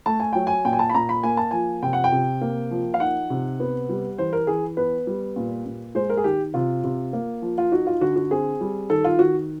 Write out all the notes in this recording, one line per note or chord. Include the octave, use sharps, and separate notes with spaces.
A3 A5
G#5
F#3 G5
G#5
A#2 G5
G#5
A5
B5
A#2 A#5
B5
A#3 G#5
A5
F3 G#5
C3 G5
F#5
G5
C3
A#3
F3
F5
D#4 F#5
C3
B3
G3
E3 C5
A#4
E3 G#4
B3 B4
G3
A#2
A#2
G#3 C5
A#4
G#4
D#3 G4
C3 F4
C3
A#3
F3
F4
D#4 F#4
F4
D3 F#4
F#4
C4 G#4
G3
D#3 A4
F4
D#3 F#4